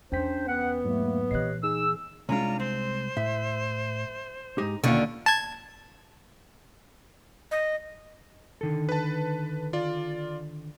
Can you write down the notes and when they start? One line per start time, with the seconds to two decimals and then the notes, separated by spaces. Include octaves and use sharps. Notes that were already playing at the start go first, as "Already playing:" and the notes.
0.12 E2 C#4 D4 C5 G5 B6
0.47 B3 F#5
0.84 G#2 F#3 A3 A#3
1.31 A#2 E3 G4 C#5 D#5 F#6 C7
1.63 D#4 G#4 E6
2.29 C2 G#3 C#4 D4 F4 A#5
2.60 C4 C5
3.17 A2 E5
4.58 G#2 G#3 D#4 G4
4.84 D#2 B2 D3 C#4 F4 C#6
5.26 A5 G#6
7.51 D#5
8.61 D3 D#3 A4
8.89 B4 A5
9.73 F4 D5